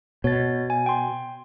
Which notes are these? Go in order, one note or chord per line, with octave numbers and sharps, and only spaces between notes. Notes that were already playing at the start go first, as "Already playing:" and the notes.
B2 C#5 A6
G#5
G5 C6